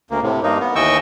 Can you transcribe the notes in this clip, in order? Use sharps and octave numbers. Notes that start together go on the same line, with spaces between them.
D2 A#3
A2 C3
G2 A#3 D#4
B3
D#2 E3 D#5 G5 C#6 E6